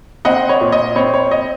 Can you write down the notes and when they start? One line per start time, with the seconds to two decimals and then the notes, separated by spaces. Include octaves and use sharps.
0.25 C4 D#5 F#5
0.49 C#5
0.61 A#2
0.72 D#5
0.96 C4 C#5
1.14 C#5
1.31 D#5